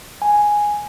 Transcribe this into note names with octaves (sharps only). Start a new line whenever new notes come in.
G#5